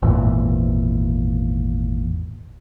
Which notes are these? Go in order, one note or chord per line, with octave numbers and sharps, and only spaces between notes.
G#1 E2 A#2 E3